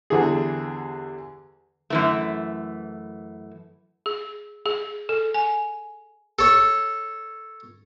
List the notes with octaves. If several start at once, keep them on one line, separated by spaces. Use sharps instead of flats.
E2 D3 E3 G3 G#4
F#2 E3 A3
G#4
G#4
A4
G#5
A4 C#5